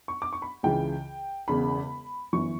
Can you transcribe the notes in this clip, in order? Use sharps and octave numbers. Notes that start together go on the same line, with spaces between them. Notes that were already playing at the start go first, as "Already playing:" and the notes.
C#6
D6
C#6
B5
C#2 C#3 E3 G5
E1 E2 C#3 B5
G1 F#2 E3 C#6